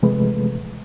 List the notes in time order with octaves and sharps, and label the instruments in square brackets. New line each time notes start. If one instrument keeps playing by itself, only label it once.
[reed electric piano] C3 E3 F3 G#3 A3 B4